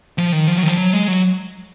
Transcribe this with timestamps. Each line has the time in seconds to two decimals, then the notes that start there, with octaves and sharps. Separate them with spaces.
0.18 F3
0.32 D#3
0.47 F3
0.58 F#3
0.63 D#3
0.68 F3
0.78 F#3
0.93 G#3
1.08 F#3